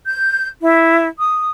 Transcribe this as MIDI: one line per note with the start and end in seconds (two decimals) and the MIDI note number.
0.05 0.46 91
0.62 1.08 64
1.18 1.50 87